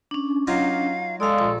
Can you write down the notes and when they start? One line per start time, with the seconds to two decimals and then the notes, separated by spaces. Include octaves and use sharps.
0.11 C#4 D4
0.47 F#3 D#4 F4 F5
1.20 G#3 A4 D5 F5
1.39 A#1